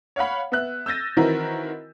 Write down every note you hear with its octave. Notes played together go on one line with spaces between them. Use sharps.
C#5 F5 F#5 B5
B3 E5 F#6
E6 G6 A6 A#6 D#7
D#3 E3 C4 E4 F#4 A#4